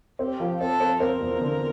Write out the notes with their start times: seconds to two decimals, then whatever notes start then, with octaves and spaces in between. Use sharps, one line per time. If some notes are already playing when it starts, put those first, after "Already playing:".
0.19 C4 G4
0.40 F3
0.60 C4 A4
0.80 C4
1.00 C4 A#4
1.21 E2
1.41 D3